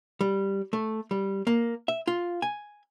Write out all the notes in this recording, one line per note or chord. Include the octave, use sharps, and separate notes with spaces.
G3
A3
G3
A#3
E5
F4
G#5